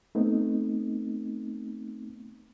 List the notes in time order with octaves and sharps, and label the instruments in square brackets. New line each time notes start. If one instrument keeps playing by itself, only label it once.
[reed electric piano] A3 B3 C4 D#4